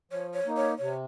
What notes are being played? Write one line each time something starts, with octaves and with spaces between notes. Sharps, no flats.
F3 C#5
C#5
A#3 D#4
C#5
C3 C#5